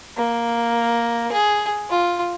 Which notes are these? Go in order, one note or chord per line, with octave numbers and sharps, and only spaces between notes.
A#3
G#4
F4